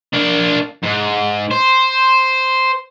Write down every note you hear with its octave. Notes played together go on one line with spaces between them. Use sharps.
A#3 D4
G#2
C5